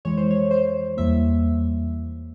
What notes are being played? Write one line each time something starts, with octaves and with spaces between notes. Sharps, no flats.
F2 E3 G#3 C#5
C5
C#5
C5
E2 E3 G3 A#3 E5